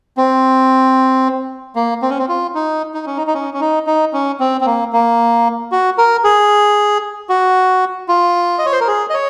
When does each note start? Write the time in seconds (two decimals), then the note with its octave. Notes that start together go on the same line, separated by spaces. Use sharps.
0.17 C4
1.76 A#3
2.02 C4
2.10 C#4
2.18 C4
2.29 F4
2.55 D#4
2.94 D#4
3.06 C#4
3.17 D#4
3.27 D#4
3.34 C#4
3.54 C#4
3.61 D#4
3.87 D#4
4.13 C#4
4.40 C4
4.61 C4
4.66 A#3
4.93 A#3
5.72 F#4
5.98 A#4
6.24 G#4
7.29 F#4
8.08 F4
8.59 D#5
8.66 C#5
8.73 C5
8.81 A#4
8.88 G#4
9.10 D#5
9.14 C#5